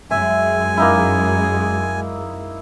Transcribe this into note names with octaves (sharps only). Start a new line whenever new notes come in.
F#2 G#3 E5 G#5
A#3 D#4 E4